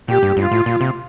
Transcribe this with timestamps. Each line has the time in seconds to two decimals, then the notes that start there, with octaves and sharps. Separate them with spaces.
0.08 A#2 G4
0.23 G2
0.37 G2 F4
0.51 A2
0.66 A#2
0.81 C3